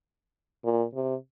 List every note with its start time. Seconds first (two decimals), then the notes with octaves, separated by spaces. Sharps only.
0.64 A#2
0.94 C3